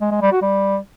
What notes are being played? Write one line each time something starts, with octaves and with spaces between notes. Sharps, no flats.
G#3
G#3
G3
F#4
G3